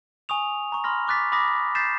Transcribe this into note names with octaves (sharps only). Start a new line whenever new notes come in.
G#5 C#6 D#6 F7
A#5 C#6
B5 C6 F6 A#6
C#6 D6 F#6 A6 B6
B5 D6 D#6 A#6 B6
G6 A6 B6 C7 E7